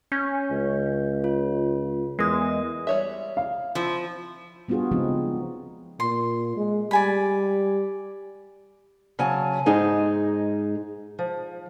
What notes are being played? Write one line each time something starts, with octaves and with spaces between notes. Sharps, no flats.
C#4 G6
C#2
F4
E2 G#3 A#4 D#6
G3 C#5 E5
F5
F3 C4 E4
G3 B3 D4 F4 F#4 G#4
C#3 F3 G#3 B3 C4 D#4
A#2 C6
G#3
G3 D5 G#5 B5
C#3 F#3 G#5 A5
G#2 G#3 D#4 G#5
F3